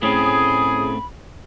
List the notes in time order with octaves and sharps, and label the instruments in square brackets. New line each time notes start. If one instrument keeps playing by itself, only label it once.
[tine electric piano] A2 C#4 [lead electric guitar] A3 C4 [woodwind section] G#4 [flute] B5